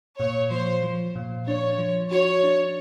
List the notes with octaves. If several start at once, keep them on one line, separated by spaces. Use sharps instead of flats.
A#2 C#5
F3 C5
F3
A#2
D4 C#5
F3
F#4 C#5
D4